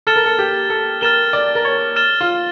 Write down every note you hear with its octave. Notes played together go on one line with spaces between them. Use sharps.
A4 F6 A6 E7 G7
A#4
A4
G4
A4
A#4 F6 A6 E7 G7
D5
A#4
C#5
F6 A6 E7 G7
F4